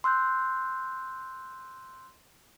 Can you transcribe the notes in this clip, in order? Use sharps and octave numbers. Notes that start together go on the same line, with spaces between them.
C6 E6 F#6 G6